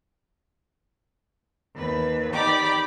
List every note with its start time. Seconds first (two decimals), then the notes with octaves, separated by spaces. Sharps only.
1.74 D#2 B4
2.32 D#4 G4 D5 B5 D6